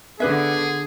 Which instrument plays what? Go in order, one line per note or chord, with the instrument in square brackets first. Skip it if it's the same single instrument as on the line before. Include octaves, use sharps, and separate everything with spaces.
[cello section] D3 B3 [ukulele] D4 B4 E5 [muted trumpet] G#4